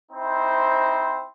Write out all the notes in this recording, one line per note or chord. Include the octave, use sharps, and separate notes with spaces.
C4 D#4 E4 C5